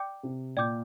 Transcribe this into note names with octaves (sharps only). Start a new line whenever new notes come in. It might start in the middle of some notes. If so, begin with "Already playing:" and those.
Already playing: D5 G5 D6 G6
C3
A#2 D5 G5 D6 G6